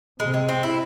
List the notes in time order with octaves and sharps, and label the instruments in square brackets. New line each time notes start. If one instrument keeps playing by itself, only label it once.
[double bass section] C3 [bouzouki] G#3
[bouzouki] G#3
C4
E4